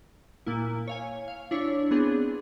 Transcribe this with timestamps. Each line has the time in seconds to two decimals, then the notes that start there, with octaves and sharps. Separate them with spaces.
0.46 A#2 A#3 E4
0.88 C#5 F5 G#5
1.28 F5
1.51 D4 E4 C#5
1.91 B3 C4 D4 G#4